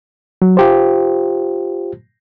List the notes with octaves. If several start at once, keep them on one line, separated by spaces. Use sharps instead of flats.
F#3
F4 G4 C5